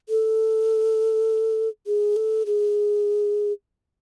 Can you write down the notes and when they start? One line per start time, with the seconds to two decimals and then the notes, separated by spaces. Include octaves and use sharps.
0.09 A4
1.87 G#4
2.16 A4
2.46 G#4